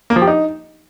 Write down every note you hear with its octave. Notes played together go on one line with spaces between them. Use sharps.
A#3
F3
G4
D#4